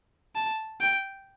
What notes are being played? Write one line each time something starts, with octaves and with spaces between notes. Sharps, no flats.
A5
G5